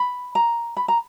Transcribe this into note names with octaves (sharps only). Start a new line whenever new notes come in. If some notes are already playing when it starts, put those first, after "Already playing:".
Already playing: B5
A#5
B5
A#5